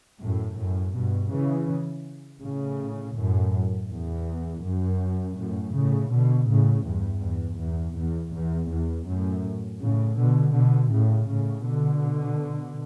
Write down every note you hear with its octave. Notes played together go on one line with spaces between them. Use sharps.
F#2 A2
F#2 A2
G2 B2
C#3 E3
A2 C#3
F#2 A2
E2
F#2
F#2 A2
A2 C#3
B2 D3
A2 C#3
E2 G2
E2
E2
E2
E2
E2
F#2 A2
A2 C#3
B2 D3
B2 D3
A2 C#3
A2 C#3
B2 D3